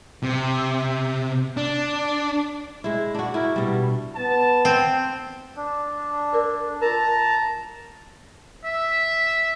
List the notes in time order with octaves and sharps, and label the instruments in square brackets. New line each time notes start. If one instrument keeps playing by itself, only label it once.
[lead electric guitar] C3
D4
[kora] G#3 E4
D4 F#4
E4 A#4
B2 G3
[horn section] B3 A5
[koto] C4
[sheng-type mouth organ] D4
[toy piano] A4 A#4 D5
[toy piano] F4 A#4 [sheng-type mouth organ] A5 A#5
[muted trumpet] E5